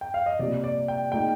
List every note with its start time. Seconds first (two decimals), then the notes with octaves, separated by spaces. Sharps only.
0.01 G5
0.14 F5
0.26 D#5
0.39 C2 A#2 G3 D5
0.64 D5
0.88 G5
1.12 A#2 G#3 D#4 G5